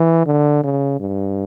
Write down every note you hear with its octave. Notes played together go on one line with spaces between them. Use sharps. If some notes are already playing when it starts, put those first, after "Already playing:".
Already playing: E3
D3
C#3
G2